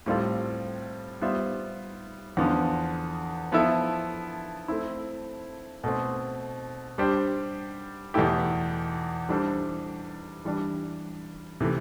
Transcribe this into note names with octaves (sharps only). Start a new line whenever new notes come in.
A2 G3 C4 F4 A4
G3 B3 F4 C5 E5
E2 D3 F3 B3
F3 B3 E4 A4 E5
A3 C4 E4
B2 A3 C4
G3 D4 G4 C5
E2 B2 A3 E4 G4
E3 G3 D4 A4 C5
E3 G3 D4
C3 E3 A3